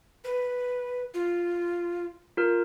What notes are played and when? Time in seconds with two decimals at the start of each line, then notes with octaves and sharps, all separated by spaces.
0.24 B4
1.14 F4
2.37 F4 A#4